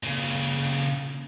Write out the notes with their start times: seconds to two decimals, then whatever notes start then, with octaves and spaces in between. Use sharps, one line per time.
0.03 A#2 C#3